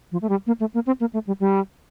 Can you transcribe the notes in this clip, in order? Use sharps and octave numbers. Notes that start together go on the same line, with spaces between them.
F3
A3
G3
A#3
A3
A#3
C4
A#3
A3
G3
G3